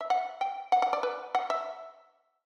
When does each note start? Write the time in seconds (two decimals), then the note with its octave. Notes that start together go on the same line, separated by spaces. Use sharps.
0.01 E5
0.10 F#5
0.41 G5
0.72 F#5
0.82 F#5
0.93 D5
1.03 B4
1.35 F#5
1.50 E5